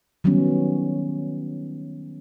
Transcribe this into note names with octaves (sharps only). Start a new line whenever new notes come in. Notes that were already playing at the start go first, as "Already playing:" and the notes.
D#3 F#3 G3 B3 C#4